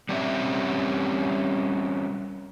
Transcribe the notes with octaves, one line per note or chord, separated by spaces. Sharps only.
G3 C4 C#4 G4 E5